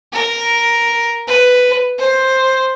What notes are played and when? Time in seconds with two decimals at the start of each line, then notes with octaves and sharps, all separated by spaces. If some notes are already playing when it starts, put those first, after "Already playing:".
0.13 A#4
1.28 B4
1.99 C5